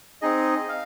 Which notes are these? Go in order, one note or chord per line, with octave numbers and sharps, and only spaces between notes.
C4 D#4 G#4 D#5
F5